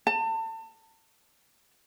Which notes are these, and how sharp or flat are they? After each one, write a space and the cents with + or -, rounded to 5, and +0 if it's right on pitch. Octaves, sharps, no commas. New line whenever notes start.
A5 +30